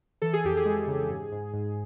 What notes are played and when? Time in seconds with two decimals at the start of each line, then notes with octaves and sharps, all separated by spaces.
0.22 E3 A4
0.33 G#4
0.44 F2 G4
0.57 G#4
0.65 G#3
0.88 C#3
1.09 G#2
1.32 G#2
1.53 G#2